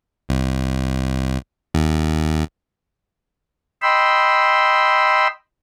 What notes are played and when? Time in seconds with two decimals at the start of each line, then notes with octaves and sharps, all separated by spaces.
0.29 C2
1.74 D#2
3.82 D#5 G5 B5 C6 E6